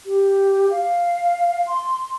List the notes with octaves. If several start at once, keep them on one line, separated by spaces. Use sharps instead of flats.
G4
F5
C6